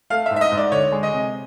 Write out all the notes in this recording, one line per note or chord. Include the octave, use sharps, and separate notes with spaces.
A3 F5
E5
G#2
E5
D#5
G#2
D5
D2 C#5
G#3
D#5
C3